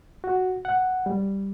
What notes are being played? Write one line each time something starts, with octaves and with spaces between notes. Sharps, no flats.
F#4
F#5
G3